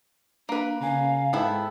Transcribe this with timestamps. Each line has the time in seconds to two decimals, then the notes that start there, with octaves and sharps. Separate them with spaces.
0.49 A#3 D4 B4
0.81 C#3 C#4 F5 G#5 A#5
1.33 G#2 B3 E4 A4 G5 A5